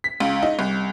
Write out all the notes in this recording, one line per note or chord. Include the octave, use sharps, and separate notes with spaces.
B6
C#2
D#4
C2